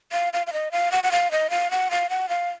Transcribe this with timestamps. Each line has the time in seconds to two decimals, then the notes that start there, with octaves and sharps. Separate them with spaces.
0.12 F5
0.33 F5
0.47 F5
0.53 D#5
0.72 F5
0.92 F#5
1.04 F#5
1.12 F5
1.31 D#5
1.50 F5
1.71 F#5
1.91 F5
2.10 F#5
2.29 F5